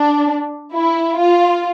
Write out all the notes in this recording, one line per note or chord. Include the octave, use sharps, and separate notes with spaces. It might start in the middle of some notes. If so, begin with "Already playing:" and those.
Already playing: D4
E4
F4